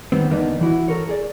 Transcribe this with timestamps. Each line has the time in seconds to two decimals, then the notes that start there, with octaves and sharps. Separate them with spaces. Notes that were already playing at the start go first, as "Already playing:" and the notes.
0.12 D#3 G3 B3 C4
0.30 E2 D3 A#3 B3 D4 D#4
0.61 E3 E4 F#4
0.88 A4 A#4 C#5
1.09 G#4 D5